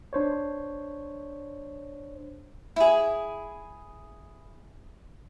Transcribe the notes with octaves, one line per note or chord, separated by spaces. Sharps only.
D4 C5 C#5
E4 G#4